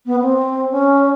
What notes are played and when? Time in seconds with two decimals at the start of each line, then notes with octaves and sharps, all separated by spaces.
0.06 B3
0.22 C4
0.71 C#4